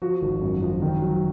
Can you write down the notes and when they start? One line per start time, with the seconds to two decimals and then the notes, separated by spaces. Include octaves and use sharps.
0.02 F3 F#4
0.22 G#1
0.42 F#2
0.62 F3
0.82 D#3
1.02 F#3